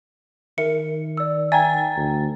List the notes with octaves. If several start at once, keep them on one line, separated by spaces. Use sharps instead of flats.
D#3 A#4 E5 C#7
D5 E6
E5 G5 G#5 A#5 G#6 A6
D2